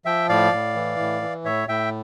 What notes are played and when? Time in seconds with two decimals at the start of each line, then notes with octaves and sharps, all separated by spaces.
0.05 F3 E5 G5
0.29 A2 D5 F5
0.52 A2
0.75 E3
0.99 A2
1.22 E3
1.45 A2 C#5 E5
1.68 A2 E5 G5